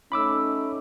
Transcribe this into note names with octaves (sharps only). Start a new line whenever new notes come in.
A3 C#4 D#4 B5 D6 E6